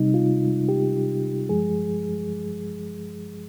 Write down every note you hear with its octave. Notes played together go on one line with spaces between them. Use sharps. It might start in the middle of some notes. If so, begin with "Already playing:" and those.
Already playing: C3 G3 D#4
F4
G4
G2 F3 G#3 G#4